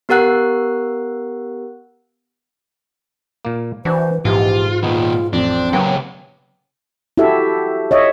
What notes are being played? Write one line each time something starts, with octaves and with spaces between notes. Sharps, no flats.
B3 G4 A#4 F#5 F#6
A#2 A#3
E3 D4 F#4 C5
A#1 G#2 E3 F4 G4
A#2 D#3 B3 D#4 F4
A1 F2 C4 D4
C#3 F#3 A#3 B3 G4
E4 F#4 G4 A4 E5
C#5 D#5 E5